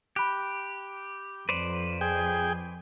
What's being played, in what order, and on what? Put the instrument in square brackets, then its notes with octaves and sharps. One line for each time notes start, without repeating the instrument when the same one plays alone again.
[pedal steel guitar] G4 [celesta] B5 F#6
[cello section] F2 [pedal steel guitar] B4 C5 D5
[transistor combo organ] G#4 G5